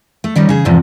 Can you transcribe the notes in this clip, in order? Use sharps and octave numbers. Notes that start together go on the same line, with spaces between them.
A3
D#3 G3 C#4 D#4
C#3 G#4
E2 G#2 C3 F3